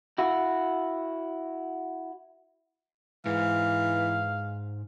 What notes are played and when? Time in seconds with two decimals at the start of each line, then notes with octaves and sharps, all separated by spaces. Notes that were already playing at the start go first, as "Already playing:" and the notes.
0.18 E4 F#4
3.26 G#2 E3 F5